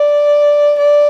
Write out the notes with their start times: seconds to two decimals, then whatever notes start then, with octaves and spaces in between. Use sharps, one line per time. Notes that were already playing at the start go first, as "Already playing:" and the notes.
Already playing: D5
0.78 D5